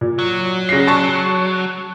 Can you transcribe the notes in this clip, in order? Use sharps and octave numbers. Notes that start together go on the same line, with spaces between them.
A#2
F#3
C#3 A#6 C7
A5 C#6